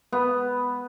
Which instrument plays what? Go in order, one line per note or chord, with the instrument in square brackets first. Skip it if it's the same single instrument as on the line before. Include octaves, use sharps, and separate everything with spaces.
[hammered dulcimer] B3